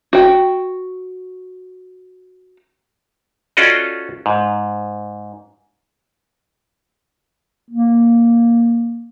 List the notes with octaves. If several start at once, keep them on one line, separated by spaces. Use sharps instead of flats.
F#4 G5
C#4 F4 F#4 A4 D5 D#5
G#2
A#3